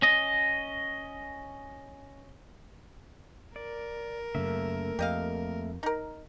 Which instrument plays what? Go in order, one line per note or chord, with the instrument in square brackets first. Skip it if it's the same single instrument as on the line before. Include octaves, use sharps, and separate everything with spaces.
[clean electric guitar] C#4 D#5
[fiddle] A#4 [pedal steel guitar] D5
[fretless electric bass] F#2 C#3 [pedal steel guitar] A3 A#3 E5
[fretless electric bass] F2 [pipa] G4 D#5 F5
[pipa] D#4 A#4